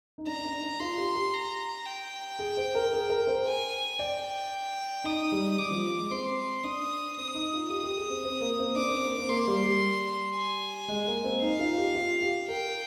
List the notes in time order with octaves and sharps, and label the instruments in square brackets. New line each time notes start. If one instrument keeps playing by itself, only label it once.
[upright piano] D#4
[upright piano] D4 [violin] A#5
[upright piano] D#4
D4
D4
[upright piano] F4 [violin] C6
[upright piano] G4
G4
[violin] A#5
G5
[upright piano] G#4
C5
A#4
G#4
A#4
C5
[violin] G#5
[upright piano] D5 [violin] G5
[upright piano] D#4 [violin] D#6
[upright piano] G3
[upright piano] G3 [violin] D6
[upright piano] F3
G#3
[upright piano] C4 [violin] C6
[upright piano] D4 [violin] D#6
[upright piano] C4 [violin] D#6
[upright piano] D#4
F4
[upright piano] G4 [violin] D#6
[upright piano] G4
G#4
C4
C4
A#3
C4
[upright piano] D4 [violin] D6
[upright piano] C4
A#3
C4
[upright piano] A#3 [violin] C6
[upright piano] G3
G3
[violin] G#5
[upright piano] G#3
A#3
C4
[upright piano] D#4 [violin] F5
[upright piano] F4
G4
F4
G4
[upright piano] A#4 [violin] G5